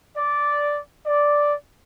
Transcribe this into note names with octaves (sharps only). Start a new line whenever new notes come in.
D5
D5